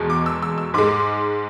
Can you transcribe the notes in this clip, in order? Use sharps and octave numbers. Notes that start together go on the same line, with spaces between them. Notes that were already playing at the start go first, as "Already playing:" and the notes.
Already playing: E2 B2 G#3
D6
E6
E6
E6
G#2 G#3 D6